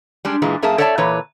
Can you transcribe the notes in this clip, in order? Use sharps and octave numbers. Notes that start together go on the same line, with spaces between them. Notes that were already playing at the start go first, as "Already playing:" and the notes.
G3 G#3 D4
A#2 E3 G#3
F#2 A#3 G#4 E5 A5
A4 C#5 D5 E5 G5 A5
A#2 E3 B4 C#5